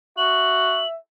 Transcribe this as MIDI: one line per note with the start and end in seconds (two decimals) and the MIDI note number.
0.18 0.81 66
0.18 0.97 76
0.18 0.87 102